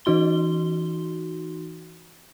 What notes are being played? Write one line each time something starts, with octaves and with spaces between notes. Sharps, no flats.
E3 D#4 F#4 C6 G7